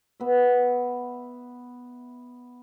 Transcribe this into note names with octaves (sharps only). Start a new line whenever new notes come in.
B3 E5